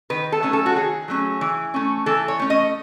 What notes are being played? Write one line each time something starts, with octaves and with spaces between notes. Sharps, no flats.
D#3 B4
A4
F#3 A3 C#4
A4
F#4
D#3 G#4
F#3 A3 C#4
E3
A3 C#4
E3 A4
C#5
A3 C#4
D#5